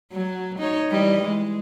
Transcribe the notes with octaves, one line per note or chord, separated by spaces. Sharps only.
F#3
D#4 C#5
E3 G3 D#5
G#3